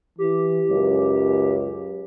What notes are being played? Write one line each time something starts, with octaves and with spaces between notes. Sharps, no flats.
E3 G4
C#2 F#2